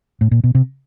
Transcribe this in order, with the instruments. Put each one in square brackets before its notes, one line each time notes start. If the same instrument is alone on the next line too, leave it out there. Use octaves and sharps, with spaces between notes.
[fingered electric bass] A2
A#2
B2
C3